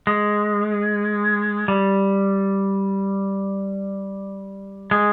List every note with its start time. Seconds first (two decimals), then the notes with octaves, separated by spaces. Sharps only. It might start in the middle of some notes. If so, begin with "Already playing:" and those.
0.07 G#3
1.68 G3
4.91 G#3